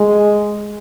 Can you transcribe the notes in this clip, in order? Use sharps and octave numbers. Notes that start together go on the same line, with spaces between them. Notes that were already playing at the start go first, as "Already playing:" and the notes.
Already playing: G#3